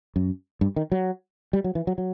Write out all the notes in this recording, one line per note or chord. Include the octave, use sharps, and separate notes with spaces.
F#2
G2
D#3
F#3
G3
F#3
E3
F#3
F#3